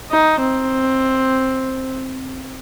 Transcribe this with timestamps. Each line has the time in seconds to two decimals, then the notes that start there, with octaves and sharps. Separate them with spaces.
0.11 D#4
0.40 C4